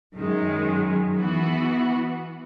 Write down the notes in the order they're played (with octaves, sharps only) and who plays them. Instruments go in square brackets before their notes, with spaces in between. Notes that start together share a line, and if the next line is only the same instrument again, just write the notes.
[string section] F#2 D#3 G#3
E3 B3 F#4